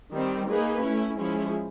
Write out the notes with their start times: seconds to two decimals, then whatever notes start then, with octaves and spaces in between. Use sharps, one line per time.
0.13 D#3 G3 C4
0.49 A#3 D#4 G#4 B4
0.84 A3 C#4 E4
1.18 F3 G#3 C#4 E4 G#4